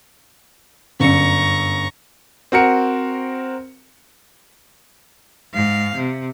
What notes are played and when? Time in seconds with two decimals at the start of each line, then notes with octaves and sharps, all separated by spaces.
1.00 G1 F#2 A#5 C#6 C#7
2.52 C4 F#4 A#4 C#7
5.54 G#2 F5
5.96 C3